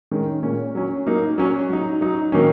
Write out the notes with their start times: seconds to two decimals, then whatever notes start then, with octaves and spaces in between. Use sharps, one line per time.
0.11 D#3 G#3 C#4
0.42 A#2 A#3 C#4
0.75 F#3 C#4
1.07 F#3 A#3 D#4
1.38 F#3 C#4
1.69 F#3 D#4
2.01 F#3 D#4
2.32 D#3 F#3 A#3 C#4